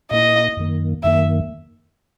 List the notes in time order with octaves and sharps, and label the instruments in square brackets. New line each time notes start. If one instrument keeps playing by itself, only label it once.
[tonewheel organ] A#2 A#3 E4 [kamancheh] D#5
[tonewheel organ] F#2 D#3 A#3
[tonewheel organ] F#2 D#3 A#3 [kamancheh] E5